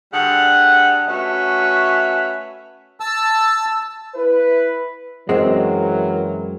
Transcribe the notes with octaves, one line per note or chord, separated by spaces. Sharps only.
D3 G3 G#4 F#5
A3 C#4 F#4 B4 C#5 E5
A5 E6
E4 B4
F#2 E3 F#3 G#3 C4 A#4